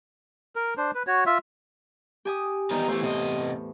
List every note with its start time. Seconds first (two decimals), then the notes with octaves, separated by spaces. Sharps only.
0.56 A#4
0.77 D4 C5
0.95 B4
1.07 F#4 C#5
1.26 F4 E5
2.25 G4 G#5 D#6
2.71 E2 D#3 G3 D#4
2.88 E3 F3 A3 C5
3.03 A2 C3 D#5